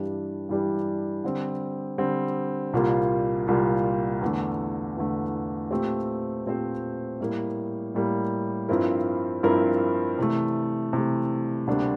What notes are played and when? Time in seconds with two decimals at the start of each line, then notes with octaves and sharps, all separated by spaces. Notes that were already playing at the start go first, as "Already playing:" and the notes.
Already playing: G2 E3 G3 D4 G4
0.49 G2 E3 G3 D4 G4
1.24 D3 G3 C4
1.98 D3 G3 C4
2.73 C2 A#2 G3 A#3 F4
3.47 C2 A#2 G3 A#3 F4
4.21 E2 D3 A3
4.97 E2 D3 A3
5.71 A#2 A3 C4 G4 C5
6.46 A#2 A3 C4 G4 C5
7.20 A2 G3 A#3
7.94 A2 G3 A#3
8.69 G2 F3 C4 E4 A#4
9.43 G2 F3 C4 E4 A#4
10.19 C3 E3 A3
10.93 C3 E3 A3
11.67 D2 C3 G3 A#3 D4